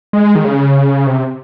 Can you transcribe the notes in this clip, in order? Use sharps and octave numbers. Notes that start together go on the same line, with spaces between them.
G#3
D#3
C#3
C3